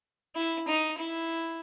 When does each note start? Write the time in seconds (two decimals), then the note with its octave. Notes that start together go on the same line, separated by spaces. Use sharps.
0.36 E4
0.68 D#4
0.98 E4